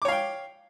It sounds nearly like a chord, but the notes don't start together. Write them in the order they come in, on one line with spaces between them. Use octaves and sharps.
D6 C#5 F5 G5